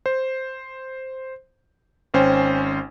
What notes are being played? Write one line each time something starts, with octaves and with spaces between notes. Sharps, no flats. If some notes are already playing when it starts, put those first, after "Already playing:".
C5
G#1 C#4 C5 G5